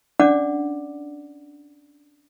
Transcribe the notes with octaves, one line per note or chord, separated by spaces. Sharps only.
C#4 D4 D5 F#5 D6